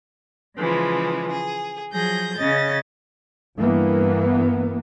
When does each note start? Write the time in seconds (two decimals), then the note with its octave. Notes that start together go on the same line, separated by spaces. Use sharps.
0.57 C#3 E3 F3 G#3
1.31 G#4
1.91 F3 F#3 G#4 G6 A#6
2.36 C#3 C#4 D#5 A6
3.57 G2 E3 A#3 B3